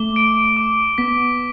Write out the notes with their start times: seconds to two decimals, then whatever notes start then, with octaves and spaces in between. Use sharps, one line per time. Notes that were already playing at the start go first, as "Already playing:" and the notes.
Already playing: A3 D6 G7
0.16 D7
0.57 D6
0.98 B3 B6